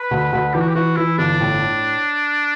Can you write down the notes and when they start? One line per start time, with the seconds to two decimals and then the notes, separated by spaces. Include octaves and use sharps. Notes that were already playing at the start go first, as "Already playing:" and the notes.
Already playing: B4
0.11 D2
0.32 D2
0.54 E3 G4
0.61 F#4
0.69 G4
0.75 E3 F#4
0.97 E3 E4
1.18 G1 D4
1.40 A2